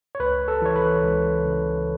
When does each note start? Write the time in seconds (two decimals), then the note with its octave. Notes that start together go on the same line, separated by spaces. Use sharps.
0.15 C#5
0.20 C#2 B4
0.48 A4
0.62 E3 C#5
0.76 B4
1.04 C#2
1.45 C#3